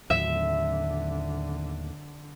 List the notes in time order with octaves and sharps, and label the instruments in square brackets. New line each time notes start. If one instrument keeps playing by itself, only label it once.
[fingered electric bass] D#2 A2 F#3 [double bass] D3 [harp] E5